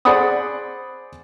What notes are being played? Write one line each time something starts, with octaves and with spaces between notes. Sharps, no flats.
G#4 C5 D5 F#5 B5 D#6